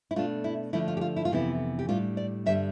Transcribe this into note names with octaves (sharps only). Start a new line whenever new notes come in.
E4
B2 A3 D4 F4
E4
D3 F3 A3 D4 E4
F4
G4
F4
E4
F4
F2 C3 E3 B3 E4
G4
A2 G3 D4 F4
D5
G2 D3 G3 D4 E5